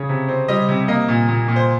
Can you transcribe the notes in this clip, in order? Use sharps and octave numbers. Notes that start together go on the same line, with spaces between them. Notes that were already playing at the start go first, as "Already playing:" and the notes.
Already playing: C#3 C#5
C3
C4
G3 D#5
C3
A#3 D#5
A#2
A#2
A#2
C5